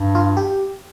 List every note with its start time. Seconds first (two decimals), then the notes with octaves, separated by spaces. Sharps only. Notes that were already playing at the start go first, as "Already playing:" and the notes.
Already playing: G2
0.15 F4
0.37 G4